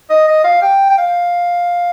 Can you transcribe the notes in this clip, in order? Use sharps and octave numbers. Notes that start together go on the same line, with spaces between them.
D#5
D#5
F5
G5
G5
F5